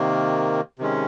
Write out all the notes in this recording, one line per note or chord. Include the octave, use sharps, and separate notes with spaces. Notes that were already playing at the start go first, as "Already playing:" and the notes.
Already playing: C3 D#3 A#3
C3 D#3 G#3 C#4